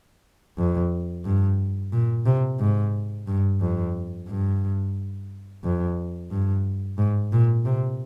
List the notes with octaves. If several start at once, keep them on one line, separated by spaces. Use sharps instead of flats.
F2
G2
A#2
C3
G#2
G2
F2
G2
F2
G2
G#2
A#2
C3